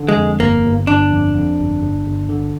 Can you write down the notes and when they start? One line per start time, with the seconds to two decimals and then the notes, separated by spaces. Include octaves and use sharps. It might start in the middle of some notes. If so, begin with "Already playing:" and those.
Already playing: D3
0.09 G#3
0.17 F2
0.40 G1 A#3
0.65 G1
0.87 G1 D4
1.11 F2
1.35 F2
1.59 G1
1.83 G1
2.07 G1
2.29 D3